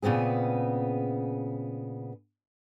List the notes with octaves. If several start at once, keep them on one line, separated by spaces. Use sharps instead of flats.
A#2 C#3 B3 C4 G#4